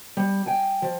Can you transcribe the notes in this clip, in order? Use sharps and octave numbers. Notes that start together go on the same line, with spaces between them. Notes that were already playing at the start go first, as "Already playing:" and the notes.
G3
G5 G#5
F3